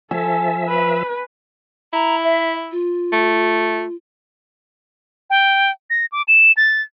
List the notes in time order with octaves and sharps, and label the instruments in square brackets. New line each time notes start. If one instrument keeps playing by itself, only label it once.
[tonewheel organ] F3 E5 [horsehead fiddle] A4 A5 [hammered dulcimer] G#5
[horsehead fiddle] B4
[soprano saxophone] E4 [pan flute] A#5
[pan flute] E5
F4
[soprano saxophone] A3
[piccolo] G5
A#6
D6
E7
A6